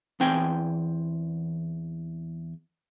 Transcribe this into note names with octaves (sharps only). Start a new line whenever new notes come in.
E2 E3 C4 G5 G#5